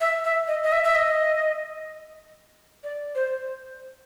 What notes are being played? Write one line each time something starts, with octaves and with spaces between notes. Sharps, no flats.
E5
E5
D#5
D#5
E5
E5
D#5
D5
C5